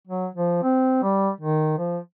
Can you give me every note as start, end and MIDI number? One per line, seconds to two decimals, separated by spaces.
0.08 0.28 54
0.35 0.62 53
0.63 0.99 60
1.03 1.30 55
1.41 1.74 51
1.78 1.98 53